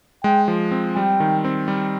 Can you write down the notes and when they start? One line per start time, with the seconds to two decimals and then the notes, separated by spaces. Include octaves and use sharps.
0.24 G#3 G5
0.48 F3
0.71 C4
0.95 G3 G5
1.20 D#3
1.45 C4
1.68 G3